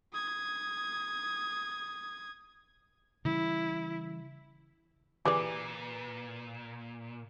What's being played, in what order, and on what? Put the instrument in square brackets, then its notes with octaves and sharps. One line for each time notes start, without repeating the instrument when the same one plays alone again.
[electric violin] D#6 G#6
[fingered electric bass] C#3 E3 G3 [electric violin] E4
[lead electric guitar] A#2 [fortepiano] E3 [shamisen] G4 G#4 D5